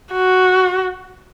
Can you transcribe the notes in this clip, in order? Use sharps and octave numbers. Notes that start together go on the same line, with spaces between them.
F#4